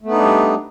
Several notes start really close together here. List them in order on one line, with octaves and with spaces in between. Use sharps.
A3 B3 D#4 D4 G3